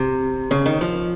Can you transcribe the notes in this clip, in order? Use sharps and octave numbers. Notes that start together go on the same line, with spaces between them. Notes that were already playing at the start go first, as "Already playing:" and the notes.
Already playing: C3
C#3
D#3
F3